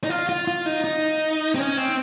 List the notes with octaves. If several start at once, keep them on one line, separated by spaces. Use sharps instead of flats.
D#4
F4
F4
F4
D#4
D#4
C4
C#4
C4